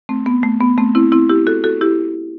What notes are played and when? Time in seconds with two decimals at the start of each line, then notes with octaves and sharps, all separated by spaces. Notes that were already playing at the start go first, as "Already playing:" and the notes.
0.09 A3 C4
0.26 B3
0.43 A3
0.60 B3
0.78 A3 C4
0.95 C4 E4
1.12 C4 E4
1.29 E4 G4
1.47 F#4 A4
1.64 F#4 A4
1.81 E4 G4